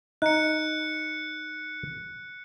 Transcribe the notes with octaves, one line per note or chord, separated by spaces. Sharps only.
D#4 F#6 C#7